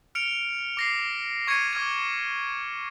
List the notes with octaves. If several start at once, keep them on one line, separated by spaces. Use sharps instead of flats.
F6 C#7 D7 F7
D6 A#6 C7
C#6 G#6 A#6 C#7 D#7
D6 F6 G#6